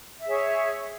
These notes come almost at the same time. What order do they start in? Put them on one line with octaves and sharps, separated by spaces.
E5 G#4 C#5